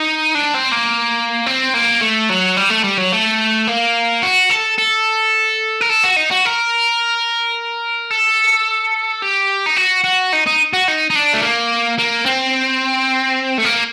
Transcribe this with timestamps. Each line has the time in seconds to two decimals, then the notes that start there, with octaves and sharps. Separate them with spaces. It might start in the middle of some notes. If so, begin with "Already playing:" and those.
Already playing: D#4
0.35 D4
0.54 C4
0.72 A#3
1.46 C4
1.74 A#3
2.01 A3
2.30 F#3
2.57 G3
2.70 A3
2.84 G3
2.98 F#3
3.12 A3
3.67 A#3
4.23 F#4
4.51 A4
4.78 A4
5.81 A#4
5.89 A4
6.04 F#4
6.16 D#4
6.31 F#4
6.45 A#4
8.11 A4
9.22 G4
9.66 D#4
9.77 F#4
10.04 F#4
10.33 D#4
10.47 D#4
10.73 F#4
10.88 D#4
11.10 D#4
11.15 D4
11.34 A3
11.43 A#3
11.98 A#3
12.26 C4
13.58 A3
13.64 A#3